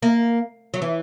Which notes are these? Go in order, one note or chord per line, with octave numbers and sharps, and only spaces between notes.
A#3
F#3
E3